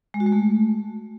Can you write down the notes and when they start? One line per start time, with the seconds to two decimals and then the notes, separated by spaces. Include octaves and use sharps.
0.14 G#3
0.20 F#4
0.26 G#3
0.32 A3